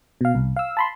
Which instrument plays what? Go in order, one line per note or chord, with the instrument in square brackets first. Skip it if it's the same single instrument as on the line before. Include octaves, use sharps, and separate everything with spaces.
[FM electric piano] B2 F5
C2
F5 E6
A5 B5 C6